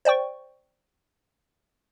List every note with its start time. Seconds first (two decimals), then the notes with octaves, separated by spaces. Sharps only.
0.05 C5 D5 G5 C#6